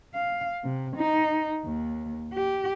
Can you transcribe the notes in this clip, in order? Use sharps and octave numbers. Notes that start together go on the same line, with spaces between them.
F5
C3
D#4
D#2
G4